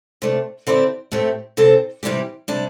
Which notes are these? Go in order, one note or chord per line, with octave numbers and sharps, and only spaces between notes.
C3 A3 D4
D3 C4 E4 G4 D5
A2 A3 C4 G4
C3 E3 C4 A4 C5
C3 E3 G3 D4 G4
C3 G3 D4